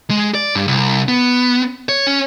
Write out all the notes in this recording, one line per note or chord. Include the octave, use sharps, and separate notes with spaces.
G#3
D5
G2
C2
B3
C#5
C#4